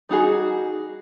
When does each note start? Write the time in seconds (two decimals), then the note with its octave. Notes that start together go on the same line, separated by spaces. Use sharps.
0.09 G3 D#4 F#4 G#4